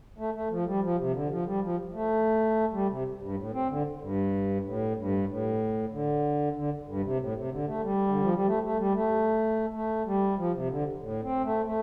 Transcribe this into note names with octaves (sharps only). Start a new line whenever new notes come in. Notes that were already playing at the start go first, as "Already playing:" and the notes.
A3
A3
F3
G3
F3
C3
D3
F3
G3
F3
A3
G3
C3
G2
A2
C4
D3
G2
A2
G2
A2
D3
D3
G2
C3
A2
C3
D3
A3
G3
D3
F3
G3
A3
A3
G3
A3
A3
G3
F3
C3
D3
A2
C4
A3
A3